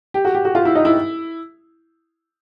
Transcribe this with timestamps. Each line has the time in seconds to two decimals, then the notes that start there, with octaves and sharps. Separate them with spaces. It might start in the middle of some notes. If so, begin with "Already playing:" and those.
0.14 G4
0.25 F#4
0.35 G4
0.45 F#4
0.55 F4
0.65 E4
0.75 D#4
0.85 E4